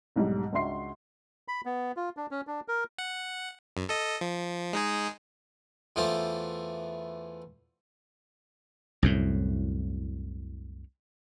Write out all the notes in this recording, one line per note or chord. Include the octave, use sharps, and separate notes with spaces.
B1 G#2 G3
C#2 D4 F#4 E5 C6 C7
B5
B3
F4
D4
C#4
D4
A#4
F#5
F#2
A4 D#5
F3
G#3 D#4 G#4
E2 E3 A3 F4 C5 D6
C2 F#2 A2